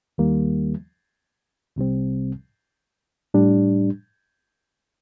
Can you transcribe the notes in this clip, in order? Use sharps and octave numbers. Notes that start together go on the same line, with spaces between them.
D#2 D#3 G3 A#3
C2 C3 G3 C4
A2 G3 D4